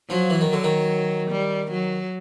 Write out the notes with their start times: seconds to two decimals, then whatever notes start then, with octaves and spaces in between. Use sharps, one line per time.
0.10 F3 F#3
0.30 E3
0.41 D#3
0.49 D3 F#3
0.64 D#3
1.31 G3
1.71 F#3